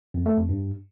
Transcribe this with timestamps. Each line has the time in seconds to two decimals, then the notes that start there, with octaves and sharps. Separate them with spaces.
0.14 F2
0.26 A3
0.37 F2
0.49 G2